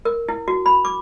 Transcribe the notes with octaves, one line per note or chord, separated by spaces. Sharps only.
A#4
E4
F#4
B5
D6